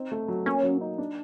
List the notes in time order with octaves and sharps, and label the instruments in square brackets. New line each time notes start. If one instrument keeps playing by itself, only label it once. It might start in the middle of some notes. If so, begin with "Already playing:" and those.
Already playing: [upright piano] C4 D#4
A3
F#3
[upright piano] A#3 [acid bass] C#4
[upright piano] F#3
D#4
D4